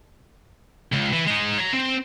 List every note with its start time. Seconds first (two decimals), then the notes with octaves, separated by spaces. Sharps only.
0.92 C#2
1.13 E3
1.27 G#3 D#4
1.58 C#5 A#5
1.73 C4